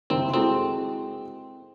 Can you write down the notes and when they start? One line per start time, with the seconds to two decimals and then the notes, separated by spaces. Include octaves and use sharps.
0.10 F#1 C2 D#3 C4 A#4
0.34 G#3 C4 E4 F#4 A4 C6